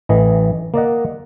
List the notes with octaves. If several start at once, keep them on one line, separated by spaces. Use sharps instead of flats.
A1 A2 E3 D#5
A#3 D5 D#5 F#5